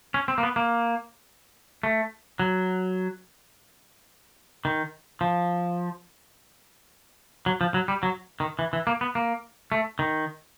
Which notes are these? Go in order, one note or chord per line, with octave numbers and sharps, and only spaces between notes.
C#4
C4
A#3
B3
A#3
A3
F#3
D#3
F3
F#3
F3
F#3
G3
F#3
D#3
E3
E3
A#3
B3
A#3
A3
D#3